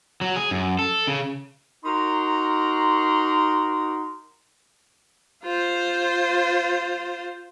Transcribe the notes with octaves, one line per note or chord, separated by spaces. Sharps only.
F#3
G#4
F#2
A4
C#3
D#4 F#4 A#4 A#5 C6
F4 C5